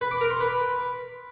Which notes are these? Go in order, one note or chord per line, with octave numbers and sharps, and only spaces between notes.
B4
D6
A#4
C6
B4